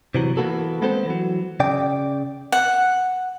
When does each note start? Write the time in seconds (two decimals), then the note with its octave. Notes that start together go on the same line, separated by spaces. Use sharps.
0.15 C3 E3 F#3
0.37 E3 G#3 A#3 B3 F#4 A4
0.82 G#3 B3 C4 A4 C5
1.06 E3 F#3
1.60 C#3 D5 G5
2.52 F#5